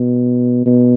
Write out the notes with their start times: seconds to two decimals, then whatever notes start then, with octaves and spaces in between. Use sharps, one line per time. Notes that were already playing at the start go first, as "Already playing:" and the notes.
Already playing: B2
0.66 B2